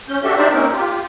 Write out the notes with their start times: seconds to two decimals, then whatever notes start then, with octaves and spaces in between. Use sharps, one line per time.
0.09 C#4 G6
0.24 D4 F#4 G4 A4 E5
0.37 D4 D#4 G4 C5 D5 E5
0.52 A#3 C4 C#4 D#4 A#4
0.73 F4 G4